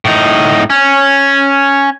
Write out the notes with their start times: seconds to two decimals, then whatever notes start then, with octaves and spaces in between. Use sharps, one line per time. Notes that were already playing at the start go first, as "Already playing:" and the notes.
0.05 A2 D#4
0.70 C#4